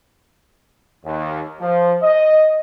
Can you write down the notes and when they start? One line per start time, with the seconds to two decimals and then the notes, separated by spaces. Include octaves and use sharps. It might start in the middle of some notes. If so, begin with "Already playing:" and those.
1.05 D#2
1.61 F3
2.02 D#5